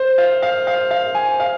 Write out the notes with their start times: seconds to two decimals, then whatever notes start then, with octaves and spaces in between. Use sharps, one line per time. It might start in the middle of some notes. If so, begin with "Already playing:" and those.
Already playing: C5
0.18 F5
0.43 F5
0.67 F5
0.91 F5
1.15 G#5
1.40 F5